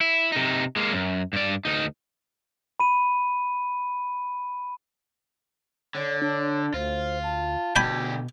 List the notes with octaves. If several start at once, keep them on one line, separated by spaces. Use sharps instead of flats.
E4
C3 D#4
G#3 A#3
F#2
G2 D5
D2 D#4
B5 D#7
D3 C#5
D4 C#5
D2 F4 C5
A5
D2 B2 G4 G5 G#5 B5